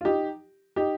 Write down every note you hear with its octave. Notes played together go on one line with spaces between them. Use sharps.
F4
D#4 G4
D#4 G4